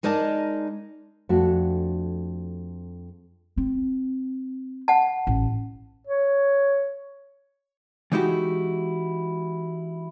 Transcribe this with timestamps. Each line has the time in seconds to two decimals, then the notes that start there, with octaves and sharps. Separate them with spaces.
0.03 G#3 D#4 A#4 D5 D#5 A5
1.29 F2 A3 D4 F#4 A5
3.57 C4
4.88 F#5 A5
5.27 A1
6.07 C#5
8.12 E3 G#3 D#4 E4 F#4 G4